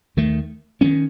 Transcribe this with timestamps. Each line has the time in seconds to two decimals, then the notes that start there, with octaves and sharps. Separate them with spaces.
0.17 D#2 D#3 A3
0.81 D#3 A#3 C#4